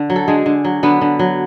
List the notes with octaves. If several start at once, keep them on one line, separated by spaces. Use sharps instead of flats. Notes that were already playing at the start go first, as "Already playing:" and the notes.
Already playing: D3
F#3
A4
D3 G#3 G#4
D3
F#3
D3 B3 B4
D3
F#3